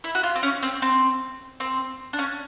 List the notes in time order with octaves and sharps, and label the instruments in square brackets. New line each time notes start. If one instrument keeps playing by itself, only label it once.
[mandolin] E4
F#4
F4
C4
C#4
C4
C4
C4
D4
C#4